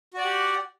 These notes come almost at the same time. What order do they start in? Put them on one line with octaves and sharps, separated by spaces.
F#4 D5 F#5 G4